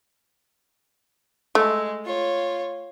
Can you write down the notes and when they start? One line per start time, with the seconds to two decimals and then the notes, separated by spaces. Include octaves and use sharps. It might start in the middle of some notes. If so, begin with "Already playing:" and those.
1.55 G#3 A3
2.05 F4 C#5